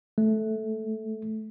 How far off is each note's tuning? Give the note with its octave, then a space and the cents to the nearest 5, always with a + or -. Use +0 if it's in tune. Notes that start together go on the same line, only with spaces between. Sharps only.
A3 -10